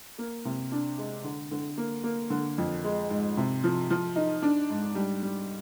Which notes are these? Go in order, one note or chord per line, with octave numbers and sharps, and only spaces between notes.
A#3
C3
D4
G#3
D3
D3
A#3
A#3
D3
F2
G#3
G#2
C3
F3
F3
D#4
D4
G#2
G3
G3